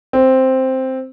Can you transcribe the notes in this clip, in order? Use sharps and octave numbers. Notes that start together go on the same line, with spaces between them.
C4